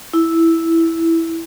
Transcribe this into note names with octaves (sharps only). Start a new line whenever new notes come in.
E4